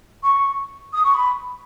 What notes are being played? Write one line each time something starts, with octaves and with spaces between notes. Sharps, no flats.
C#6
D#6
C#6
B5